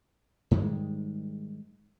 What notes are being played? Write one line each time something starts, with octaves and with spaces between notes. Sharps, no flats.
G#2 D#3 G3 G#3